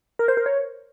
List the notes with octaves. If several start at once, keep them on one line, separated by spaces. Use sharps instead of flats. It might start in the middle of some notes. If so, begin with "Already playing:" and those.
A#4
C5
A#4
C#5